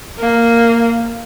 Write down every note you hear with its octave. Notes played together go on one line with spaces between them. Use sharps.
A#3